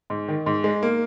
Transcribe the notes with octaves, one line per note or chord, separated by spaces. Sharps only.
G#2
D#3
G#2
G#3
A#3